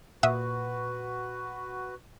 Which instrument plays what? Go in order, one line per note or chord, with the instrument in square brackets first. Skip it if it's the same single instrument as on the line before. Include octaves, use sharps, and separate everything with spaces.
[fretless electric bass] A#2 [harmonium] F#4 B4 [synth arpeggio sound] E5 F#5 D#6